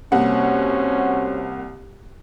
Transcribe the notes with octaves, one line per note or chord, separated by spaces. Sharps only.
C2 A#3 C#4 F#4 C5 F#5